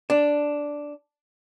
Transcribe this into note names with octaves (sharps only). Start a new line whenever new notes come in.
D4